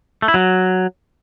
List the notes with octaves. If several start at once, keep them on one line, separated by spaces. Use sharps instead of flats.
A3
E4
F#3